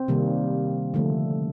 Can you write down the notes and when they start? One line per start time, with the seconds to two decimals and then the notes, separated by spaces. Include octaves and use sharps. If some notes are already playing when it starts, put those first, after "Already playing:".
Already playing: C4
0.08 C3 D#3 G3 A#3
0.94 D3 F3 A3